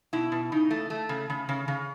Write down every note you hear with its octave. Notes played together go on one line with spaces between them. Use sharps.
B2 E4
B2
C#3 D#4
A3
A3
C#3
C#3
C#3
C#3